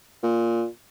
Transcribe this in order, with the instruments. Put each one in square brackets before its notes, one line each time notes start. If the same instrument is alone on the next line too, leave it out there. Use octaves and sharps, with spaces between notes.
[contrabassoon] A#2